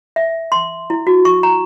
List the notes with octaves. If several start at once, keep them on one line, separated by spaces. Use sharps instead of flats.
E5
C6
E4
F#4
C#6
A#5